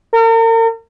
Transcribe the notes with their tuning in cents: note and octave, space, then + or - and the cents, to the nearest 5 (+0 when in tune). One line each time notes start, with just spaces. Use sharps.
A#4 -40